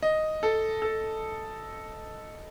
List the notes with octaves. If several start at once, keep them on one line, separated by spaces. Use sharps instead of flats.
D#5
A4
A4